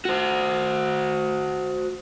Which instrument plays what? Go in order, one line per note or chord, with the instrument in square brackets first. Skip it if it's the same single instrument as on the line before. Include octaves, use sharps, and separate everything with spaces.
[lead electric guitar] F#4 C5